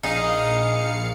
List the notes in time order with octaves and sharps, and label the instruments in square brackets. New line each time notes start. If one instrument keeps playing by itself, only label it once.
[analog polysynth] A#1 F5 C#7 [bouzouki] D#4 G#4